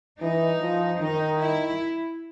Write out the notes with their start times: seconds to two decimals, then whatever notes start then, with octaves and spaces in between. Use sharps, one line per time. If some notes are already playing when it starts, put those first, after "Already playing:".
0.21 E3 D#4
0.61 F3
1.01 D#3 D#4
1.40 E4